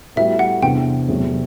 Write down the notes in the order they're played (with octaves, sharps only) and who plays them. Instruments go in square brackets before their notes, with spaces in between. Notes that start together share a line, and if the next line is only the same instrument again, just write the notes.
[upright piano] A2 G3 B3 F#4 [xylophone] E5
[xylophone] F#5
[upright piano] E2 C3 E3 B3 D4 [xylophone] G5
[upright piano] E2 C3 F#3 A3